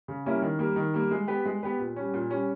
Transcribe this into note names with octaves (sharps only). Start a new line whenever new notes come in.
C#3
G3 A#3 C#4 E4
D#3
G3 A#3
D#3
G3 A#3
G#3
B3 G4 B4
G#3
B3 G4 B4
A#2
G3 C#4
A#2
G3 C#4